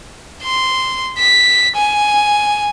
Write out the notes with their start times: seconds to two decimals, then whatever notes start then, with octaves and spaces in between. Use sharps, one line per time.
0.44 C6
1.18 B6
1.76 G#5